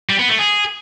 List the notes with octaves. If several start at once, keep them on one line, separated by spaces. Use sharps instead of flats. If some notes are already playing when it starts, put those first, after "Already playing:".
G3
B3
A3
G#4